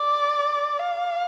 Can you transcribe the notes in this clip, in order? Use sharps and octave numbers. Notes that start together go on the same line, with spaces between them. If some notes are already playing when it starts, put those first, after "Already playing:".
Already playing: D5
F5